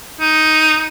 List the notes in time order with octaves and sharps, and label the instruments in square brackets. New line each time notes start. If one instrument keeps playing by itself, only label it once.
[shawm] D#4